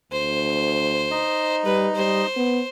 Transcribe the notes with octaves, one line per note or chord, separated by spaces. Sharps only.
D2 C5
D#4 D#5
G3 B4
G3 C5
B3